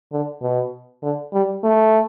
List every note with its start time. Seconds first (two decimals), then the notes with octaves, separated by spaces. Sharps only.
0.13 D3
0.42 B2
1.03 D3
1.33 G3
1.63 A3